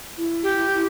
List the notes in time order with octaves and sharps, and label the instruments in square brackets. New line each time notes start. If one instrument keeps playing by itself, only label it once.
[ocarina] E4
[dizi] G4